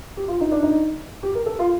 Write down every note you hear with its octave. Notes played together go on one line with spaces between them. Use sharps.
G4
F4
D#4
D4
D#4
G4
A#4
A4
F4